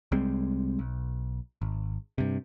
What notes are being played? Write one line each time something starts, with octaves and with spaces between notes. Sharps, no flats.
C2 G3 G#3 C4
B1
G#1
G2 C3